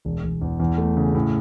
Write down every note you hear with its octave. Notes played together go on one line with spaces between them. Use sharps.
E1
E1
E2
E2
A3
C#3
A2